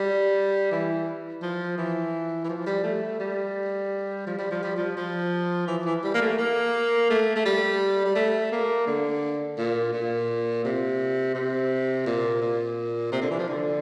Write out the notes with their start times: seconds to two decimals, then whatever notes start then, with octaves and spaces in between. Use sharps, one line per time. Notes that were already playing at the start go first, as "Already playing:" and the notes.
Already playing: G3
0.72 E3
1.42 F3
1.78 E3
2.44 E3
2.49 F3
2.66 G3
2.84 A3
3.20 G3
4.27 F3
4.39 G3
4.50 F3
4.63 G3
4.76 F3
4.97 F3
5.67 E3
5.85 E3
6.04 G3
6.14 A#3
6.21 A3
6.38 A#3
7.10 A3
7.36 A3
7.45 G3
8.05 G3
8.15 A3
8.52 A#3
8.87 D3
9.58 A#2
9.93 A#2
10.64 C3
11.35 C3
12.06 A#2
12.42 A#2
13.12 C3
13.21 D3
13.30 E3
13.39 F3
13.48 D3